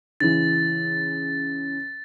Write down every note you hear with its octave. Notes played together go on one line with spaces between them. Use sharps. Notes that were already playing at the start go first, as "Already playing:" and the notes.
C#3 E3 A6